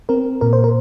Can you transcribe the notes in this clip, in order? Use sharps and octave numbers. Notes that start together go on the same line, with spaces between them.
C4 A#4
A#2 A#4
C5
A#4